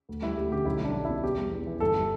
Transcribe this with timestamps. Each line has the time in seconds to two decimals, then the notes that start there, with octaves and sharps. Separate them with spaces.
0.09 D2
0.22 G3 E4
0.36 D2 G4
0.51 D3 G4
0.65 B1 E4
0.81 G3 D4
0.95 B1
1.05 B2 E4
1.23 E2 G4
1.38 G3
1.52 E2
1.67 E3
1.80 G1 A4
1.95 G3